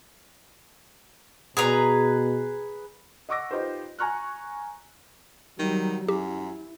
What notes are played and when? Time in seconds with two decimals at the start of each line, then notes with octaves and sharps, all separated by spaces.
1.57 B2 G#4 B4 A#5
3.29 D#5 F#5 C#6 D6 E6 A#6
3.51 D#4 F4 G4 B4 C5
3.99 G#5 A#5 C#6 F6 F#6
5.59 D#3 F#3 G3
6.08 F#2 E4 G4